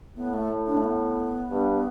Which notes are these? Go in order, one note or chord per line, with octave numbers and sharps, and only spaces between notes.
A2 B3
A3
D4
A3
B3
G2